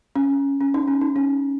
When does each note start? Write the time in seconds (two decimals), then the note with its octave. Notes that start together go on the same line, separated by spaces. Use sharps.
0.16 C#4
0.61 C#4
0.74 D#4
0.88 C#4
1.01 D#4
1.16 C#4